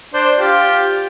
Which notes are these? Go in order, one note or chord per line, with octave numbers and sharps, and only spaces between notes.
D4 C5
F4 G4